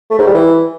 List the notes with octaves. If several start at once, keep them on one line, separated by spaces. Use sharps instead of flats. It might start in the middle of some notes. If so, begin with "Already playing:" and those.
A3
G#2
G3
E3